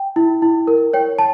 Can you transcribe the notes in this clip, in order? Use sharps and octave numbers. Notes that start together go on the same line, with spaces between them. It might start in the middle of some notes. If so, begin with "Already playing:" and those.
Already playing: G5
E4
E4
A#4
C#5 G5
A5